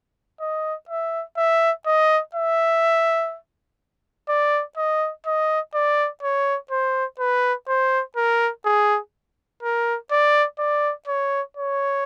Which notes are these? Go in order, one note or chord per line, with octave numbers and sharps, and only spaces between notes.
D#5
E5
E5
D#5
E5
D5
D#5
D#5
D5
C#5
C5
B4
C5
A#4
G#4
A#4
D5
D5
C#5
C#5